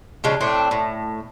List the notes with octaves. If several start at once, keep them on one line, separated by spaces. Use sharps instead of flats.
C#3 F3 G#3 D4
A2 C4 D4
A2